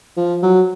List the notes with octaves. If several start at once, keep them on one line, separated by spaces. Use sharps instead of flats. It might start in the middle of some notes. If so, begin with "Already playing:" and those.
F3
F#3